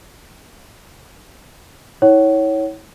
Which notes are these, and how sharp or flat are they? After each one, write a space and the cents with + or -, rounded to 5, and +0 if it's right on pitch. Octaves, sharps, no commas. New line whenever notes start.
E4 -40 C#5 +0 F#5 +35